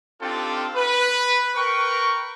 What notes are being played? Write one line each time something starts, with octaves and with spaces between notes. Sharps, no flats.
C4 D4 D#4 F4 G4 A4
B4
A#4 B4 G5 C#6